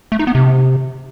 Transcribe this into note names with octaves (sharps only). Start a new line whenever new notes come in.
A3
D#4
B3
C3